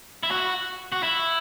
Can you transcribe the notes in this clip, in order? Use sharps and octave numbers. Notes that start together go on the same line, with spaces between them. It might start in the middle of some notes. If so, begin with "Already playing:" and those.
E4
F#4
F#4
E4